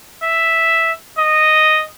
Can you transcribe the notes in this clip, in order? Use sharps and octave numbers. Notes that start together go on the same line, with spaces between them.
E5
D#5